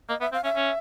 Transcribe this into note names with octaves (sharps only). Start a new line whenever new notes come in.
A#3 D#5
B3 E5
C4 F5
C#4 E5
C#4